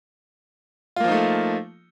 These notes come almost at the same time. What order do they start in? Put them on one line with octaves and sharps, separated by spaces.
F4 A#3 F3 D#4 A3